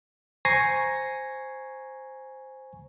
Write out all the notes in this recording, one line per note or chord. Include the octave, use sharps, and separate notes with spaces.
C5 G#5 A#5 C#6 A#6 C7